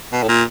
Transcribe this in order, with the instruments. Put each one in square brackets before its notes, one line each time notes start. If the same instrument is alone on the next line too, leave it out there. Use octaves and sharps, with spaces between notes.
[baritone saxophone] B2
A2
A#2